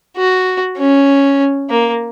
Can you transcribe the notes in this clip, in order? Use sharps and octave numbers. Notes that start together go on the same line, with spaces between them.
F#4
C#4
A#3